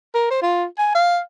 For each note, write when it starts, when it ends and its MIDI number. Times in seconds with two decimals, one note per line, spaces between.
0.14 0.29 70
0.31 0.40 72
0.42 0.65 65
0.78 0.94 80
0.95 1.19 77